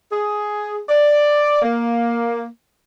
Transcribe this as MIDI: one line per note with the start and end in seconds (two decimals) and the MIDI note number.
0.12 0.81 68
0.89 1.61 74
1.62 2.47 58